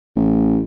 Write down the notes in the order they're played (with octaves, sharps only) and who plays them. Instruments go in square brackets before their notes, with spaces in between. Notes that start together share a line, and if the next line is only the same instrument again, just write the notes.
[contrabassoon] A1